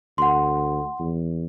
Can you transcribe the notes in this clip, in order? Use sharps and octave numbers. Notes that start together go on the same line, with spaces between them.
D2 F#5 C6
E2